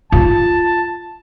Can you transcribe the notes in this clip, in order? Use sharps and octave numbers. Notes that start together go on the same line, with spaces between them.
F4 A5